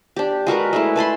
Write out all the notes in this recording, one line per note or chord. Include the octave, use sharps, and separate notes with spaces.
D4 G4
G#3 F#4 A#4 B4
G#3 A3 E4
B4 A5 B5 C6